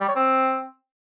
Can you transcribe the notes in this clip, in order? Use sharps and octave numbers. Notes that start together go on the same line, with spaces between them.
G3
C#5
C4